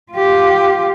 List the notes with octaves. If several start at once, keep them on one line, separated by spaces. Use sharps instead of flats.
F4 G4